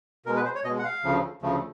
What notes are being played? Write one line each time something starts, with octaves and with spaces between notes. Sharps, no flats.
B2 G#3 A#4
B4
C5
C#5
B2 G#3 D#5
F#5
F5
D2 C#3 F3 A3
D2 C#3 F3 A3